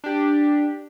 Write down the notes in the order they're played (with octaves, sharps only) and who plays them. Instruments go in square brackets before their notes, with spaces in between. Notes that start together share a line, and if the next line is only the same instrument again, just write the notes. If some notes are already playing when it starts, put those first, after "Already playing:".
[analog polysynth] D4 G4